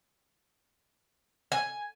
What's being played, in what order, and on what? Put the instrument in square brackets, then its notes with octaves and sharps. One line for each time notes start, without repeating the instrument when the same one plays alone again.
[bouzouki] G#5